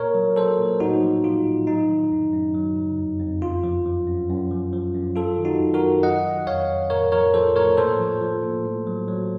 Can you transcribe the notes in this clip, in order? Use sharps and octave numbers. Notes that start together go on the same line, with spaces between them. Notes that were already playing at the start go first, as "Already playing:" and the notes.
Already playing: A#2 A#4 C#5
F#3
F#3 A4 C5
A#2
A2 D#4 F#4
F3
F3 F4
A2
F#3 D#4
D#3
F#2
F#2
F#3
C#3
F2
F2
F#2 F4
F3
F3
F#2
F#2
F3
F3
F#2
F#3 F4 A4
D#3
D#4 F#4
F#2
F#4 A#4
F#2
F#3 D#5 F#5
D#3
F2 C#5 F5
F2
A2 A#4 C#5
F3 A#4 C#5
F3 A4 C5
A2 A#4 C#5
A#2 A4 C5
F3
F3
A#2
A2
F#3
F#3